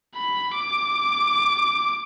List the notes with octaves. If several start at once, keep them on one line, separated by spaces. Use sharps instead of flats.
B5
D6